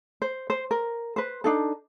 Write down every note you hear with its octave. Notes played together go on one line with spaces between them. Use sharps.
C5
C5
A#4
B4 C5
D4 D#4 A4